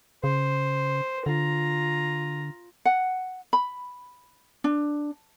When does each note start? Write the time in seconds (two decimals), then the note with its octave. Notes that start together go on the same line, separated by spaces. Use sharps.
0.24 C#3 C5
1.26 D3 F4 A#5
2.85 F#5
3.53 B5
4.64 D4